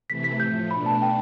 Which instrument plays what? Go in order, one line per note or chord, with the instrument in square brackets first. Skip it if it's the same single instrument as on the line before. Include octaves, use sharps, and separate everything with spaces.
[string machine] C3 E3 A3 E4 [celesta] B6
[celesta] B6
[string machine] A2 F3 A3 [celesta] G6
[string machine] B2 A3 D4 [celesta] B5
[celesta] A5
G5